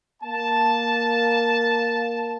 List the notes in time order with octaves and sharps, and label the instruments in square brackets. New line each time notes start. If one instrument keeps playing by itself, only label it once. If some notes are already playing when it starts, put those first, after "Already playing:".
[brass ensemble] A#3 A5